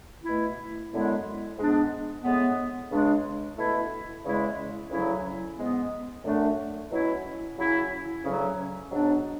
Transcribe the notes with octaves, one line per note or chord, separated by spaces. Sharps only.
B2 A3 E4
F#2 D3 G#3 B3 E4
G#2 G#3 B3 D4
A2 G#3 B3
C#2 C#3 G#3 D4
B2 A3 E4
E2 C#3 G#3 C#4 E4
D2 C#3 F#3 C#4 E4
G#2 G#3 B3
F#2 D3 A3 D4
B2 F#3 C#4 E4
C#3 F#3 C#4 E4
D2 C#3 F#3 C#4
G#2 F#3 B3 D4